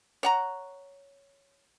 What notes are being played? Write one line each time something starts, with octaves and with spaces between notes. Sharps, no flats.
C#5 F#5 A#5